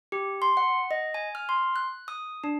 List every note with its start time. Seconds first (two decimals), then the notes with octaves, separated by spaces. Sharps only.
0.12 G4
0.42 C6
0.57 F#5
0.91 D#5
1.14 G#5
1.35 F6
1.49 C6
1.76 F#6
2.08 D#6
2.44 D4